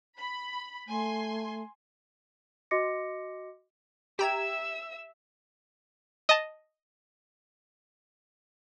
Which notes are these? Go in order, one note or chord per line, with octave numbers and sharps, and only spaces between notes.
B5
A3 G#5 C6
F#4 D#5 C6 D6 A#6 C#7
G4 E5 G5 A#5 E6 G#6
D#5 A5